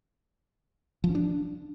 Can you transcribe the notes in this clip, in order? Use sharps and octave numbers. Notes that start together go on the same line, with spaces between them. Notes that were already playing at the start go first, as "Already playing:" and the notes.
F3
C#4
D4